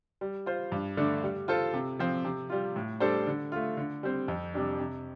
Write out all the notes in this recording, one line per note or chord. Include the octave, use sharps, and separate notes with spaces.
G3
F4 C5
G2
D3 A3 D4
G3
F4 A4 C5
C3
F3 C4
C3
G3 F4
A2
G3 D4 A4 C5
D3
A3 F4
D3
G3 C4
F2
C3 G3 D4
C3